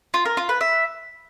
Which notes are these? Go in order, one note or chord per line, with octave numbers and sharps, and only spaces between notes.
F4
A#4
F4
B4
E5